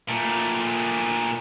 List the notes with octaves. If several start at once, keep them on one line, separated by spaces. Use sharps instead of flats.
A#2 A3